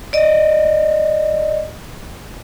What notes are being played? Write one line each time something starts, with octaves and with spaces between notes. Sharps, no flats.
D5 D#5